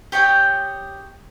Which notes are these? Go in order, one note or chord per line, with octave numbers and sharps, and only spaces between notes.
G4 C#5 D#5 G5